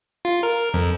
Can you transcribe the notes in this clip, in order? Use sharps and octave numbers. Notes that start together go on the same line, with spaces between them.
F4
A#4
F2